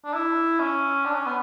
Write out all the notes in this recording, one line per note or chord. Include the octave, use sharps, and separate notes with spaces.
D4
E4
C#4
D4
C#4
B3